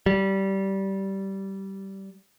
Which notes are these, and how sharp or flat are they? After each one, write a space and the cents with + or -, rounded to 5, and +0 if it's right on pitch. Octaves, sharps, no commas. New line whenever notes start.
G3 -15